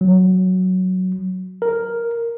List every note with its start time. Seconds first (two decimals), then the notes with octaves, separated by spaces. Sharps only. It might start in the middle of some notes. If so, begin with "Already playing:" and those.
0.01 F#3
1.62 A#4